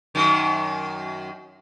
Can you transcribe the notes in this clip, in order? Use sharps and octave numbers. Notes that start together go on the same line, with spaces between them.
F#2 D#3